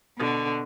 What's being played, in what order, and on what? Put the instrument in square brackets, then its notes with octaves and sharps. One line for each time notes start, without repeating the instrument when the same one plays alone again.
[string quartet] B2 D3